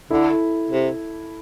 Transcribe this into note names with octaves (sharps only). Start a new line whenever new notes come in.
D3 E4 A4
C3